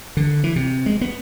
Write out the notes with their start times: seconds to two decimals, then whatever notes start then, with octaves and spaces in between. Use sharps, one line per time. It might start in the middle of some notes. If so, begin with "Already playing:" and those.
0.17 D3
0.44 E3
0.56 C3
0.86 G#3
1.01 B3